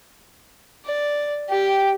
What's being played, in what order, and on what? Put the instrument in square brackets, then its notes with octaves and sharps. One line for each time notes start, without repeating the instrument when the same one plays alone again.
[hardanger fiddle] D5
[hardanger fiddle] G4 [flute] G5